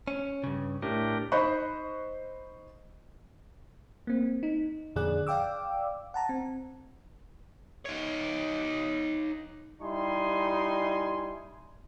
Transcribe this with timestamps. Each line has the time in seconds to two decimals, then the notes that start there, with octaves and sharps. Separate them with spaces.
0.08 C#4
0.44 G2 C#3
0.82 A2 D4 G4 A#4
1.32 D#4 C5 D#5 B5 C#6 F#6
4.07 A#3 C4
4.43 D#4
4.96 F2 A#2 D3 G#4 D5 F#6
5.27 D5 F5 G5 D6 E6
6.14 F#5 A5 A#5
6.29 C4
7.86 D#4 C#5
9.81 G3 D#4 E4 G#5 C6